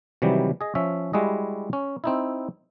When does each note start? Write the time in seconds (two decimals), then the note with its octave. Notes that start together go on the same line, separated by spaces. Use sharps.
0.22 C3 D#3 E3 F#3 G3
0.61 G#4 D#5
0.75 F3 C#4 E5
1.13 G3 G#3 E4 F#4 G#4 D#5
1.73 C#4
2.04 C4 D#4 E4